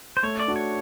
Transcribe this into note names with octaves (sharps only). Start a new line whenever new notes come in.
C5
A3 C#5
D5
D4 F#4
C#5